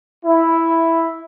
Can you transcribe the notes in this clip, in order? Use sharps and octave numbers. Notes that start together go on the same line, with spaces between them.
E4